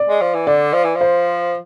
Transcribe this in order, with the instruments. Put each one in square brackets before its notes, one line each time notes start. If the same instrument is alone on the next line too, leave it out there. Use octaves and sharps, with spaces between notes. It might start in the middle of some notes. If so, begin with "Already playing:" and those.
Already playing: [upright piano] D5
[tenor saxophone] G#3
F3
E3
[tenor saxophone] D3 [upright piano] D5
[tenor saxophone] F3
E3
F3
[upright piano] C5